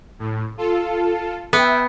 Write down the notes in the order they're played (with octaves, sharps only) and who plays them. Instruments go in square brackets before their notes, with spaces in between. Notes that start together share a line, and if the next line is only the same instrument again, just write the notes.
[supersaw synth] A2
F4 A4
[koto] B3 [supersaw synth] E5 G5